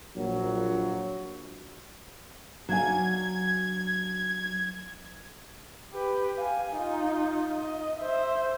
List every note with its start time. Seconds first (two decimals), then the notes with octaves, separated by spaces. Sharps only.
0.16 A#1 F#3
2.69 F#3 D4 F5 G#5 G#6
5.93 G4 B4
6.36 F5 G#5
6.76 D#4 F4
7.56 D#5
8.00 C5 E5